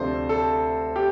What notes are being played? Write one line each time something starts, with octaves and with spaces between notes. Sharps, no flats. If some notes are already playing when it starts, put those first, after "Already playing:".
Already playing: D2 C3 F3 A3 D4 C5
A4
G4